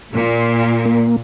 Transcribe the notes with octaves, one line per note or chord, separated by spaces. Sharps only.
A#2
A#3